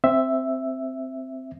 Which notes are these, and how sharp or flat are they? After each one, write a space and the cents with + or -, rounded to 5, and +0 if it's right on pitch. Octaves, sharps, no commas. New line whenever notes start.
C4 +0 E5 +0